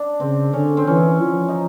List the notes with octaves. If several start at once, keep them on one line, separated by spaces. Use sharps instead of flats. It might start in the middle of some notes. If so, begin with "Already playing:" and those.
Already playing: D4
C#3 C4
D3 C#4
C4
E3 C#4
F3
D#4